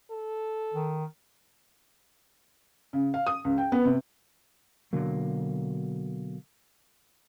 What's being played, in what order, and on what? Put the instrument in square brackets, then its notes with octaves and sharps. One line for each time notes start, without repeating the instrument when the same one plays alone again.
[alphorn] A4
[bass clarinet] D#3
[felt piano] C#3
F5
D#6
C#2
G5
B3
C3
[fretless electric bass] B2 D3 F#3 A#3